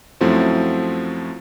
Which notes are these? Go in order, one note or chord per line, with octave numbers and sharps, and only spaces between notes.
F#2 F3 A3 C4 E4 F#4